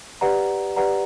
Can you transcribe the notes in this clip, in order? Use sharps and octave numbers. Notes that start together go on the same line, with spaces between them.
G4 B4 D5 F#5 A#5
G4 B4 D5 F#5 A#5